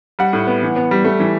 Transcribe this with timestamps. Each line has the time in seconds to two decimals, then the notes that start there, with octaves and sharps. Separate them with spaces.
0.19 G3 F#5
0.33 A2
0.47 B3
0.62 E3
0.76 B3
0.91 G3
1.04 A3
1.20 E3